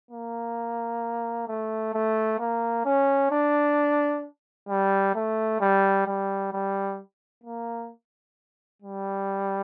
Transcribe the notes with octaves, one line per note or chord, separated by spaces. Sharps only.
A#3
A3
A3
A#3
C#4
D4
G3
A3
G3
G3
G3
A#3
G3